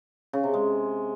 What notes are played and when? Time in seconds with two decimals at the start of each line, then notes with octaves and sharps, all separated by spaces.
0.33 C#3
0.43 C3
0.54 G#3